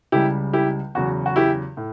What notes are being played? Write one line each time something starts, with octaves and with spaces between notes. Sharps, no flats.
C#2 C#3 G3 E4 G4
E4 G4
E2 C#3 F#3 F#4
F#4
E4 G4
A2